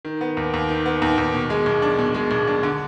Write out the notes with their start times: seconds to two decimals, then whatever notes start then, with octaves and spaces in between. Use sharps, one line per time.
0.05 D#3
0.21 B3
0.37 D#2
0.54 D#2
0.69 D#3
0.86 B3
1.02 D#2
1.18 D#2
1.34 B2
1.50 G#3
1.66 B1
1.82 D4
1.99 B2
2.14 G#3
2.31 B1
2.47 D4
2.63 D3